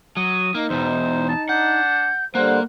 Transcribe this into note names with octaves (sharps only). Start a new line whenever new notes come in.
F#3 D#6
A#3 D#4
E2 B2 C5
A5
D4 F#5 G6
D3 G3 A#3 C5 F#5